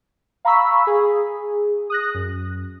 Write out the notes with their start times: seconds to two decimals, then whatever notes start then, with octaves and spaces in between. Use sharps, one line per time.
0.45 F5 A#5 B5 C#6 E6 B6
0.87 G#4
1.90 D#6 F#6 A#6
2.14 F#2